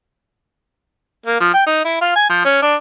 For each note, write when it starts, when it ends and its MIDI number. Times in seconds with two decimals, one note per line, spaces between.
1.26 1.40 58
1.41 1.49 53
1.54 1.62 79
1.67 1.84 63
1.85 2.00 64
2.01 2.16 65
2.16 2.29 80
2.30 2.41 53
2.45 2.60 61
2.62 2.76 62